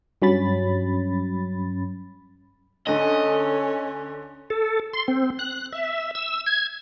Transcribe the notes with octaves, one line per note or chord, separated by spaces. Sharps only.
G2 F#3 C#4 B5 A6
D2 D3 C#4 A4 D#5
A4
C6
C4
F#6
E5
E6
G#6